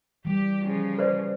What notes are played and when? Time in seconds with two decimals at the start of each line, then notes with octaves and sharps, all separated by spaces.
0.25 E3 G3 G4
0.62 C#3 F3
0.98 B4 C5 D5